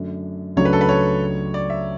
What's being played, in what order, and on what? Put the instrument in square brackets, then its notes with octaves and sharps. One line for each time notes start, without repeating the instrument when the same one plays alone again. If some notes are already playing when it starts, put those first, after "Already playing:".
Already playing: [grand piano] F#2 D3 F#3 A3 D4
[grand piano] C#2 C#3 F#3 A3 D4 [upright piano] C#5
[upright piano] B4
A4
B4
C#5
D5
E5